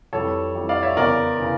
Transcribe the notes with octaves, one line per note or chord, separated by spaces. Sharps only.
F2 E3 G3 A4 C#5
F2 E3 G3
D5 F5
C#5 E5
E2 C#3 E3 A#4 D5
C#3 E3